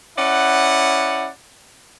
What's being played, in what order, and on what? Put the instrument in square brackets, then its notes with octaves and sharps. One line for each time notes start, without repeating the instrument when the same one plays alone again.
[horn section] C#4 E4 D5 F#5